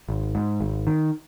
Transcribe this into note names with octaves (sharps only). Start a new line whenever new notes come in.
G#1
G#2
G#1
D#3